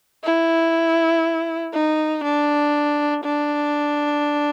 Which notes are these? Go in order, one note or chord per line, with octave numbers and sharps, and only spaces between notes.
E4
D#4
D4
D4